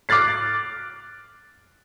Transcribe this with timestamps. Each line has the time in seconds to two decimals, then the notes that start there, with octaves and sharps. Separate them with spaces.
0.09 D6 F6 F#6 A6 C7